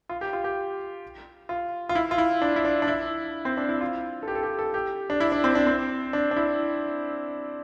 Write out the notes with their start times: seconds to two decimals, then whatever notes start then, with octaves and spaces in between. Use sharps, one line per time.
0.09 F4
0.21 G4
0.33 F4
0.44 G4
1.49 F4
1.89 F4
1.95 E4
2.11 F4
2.18 E4
2.42 D4
2.56 E4
2.65 D4
2.82 D4
2.88 E4
3.45 C4
3.57 D4
3.69 E4
3.81 F4
4.23 A4
4.28 G4
4.35 A4
4.43 G4
4.59 A4
4.74 G4
5.10 D4
5.20 E4
5.32 D4
5.44 C4
5.55 D4
5.67 C4
6.13 D4
6.31 D4
6.36 E4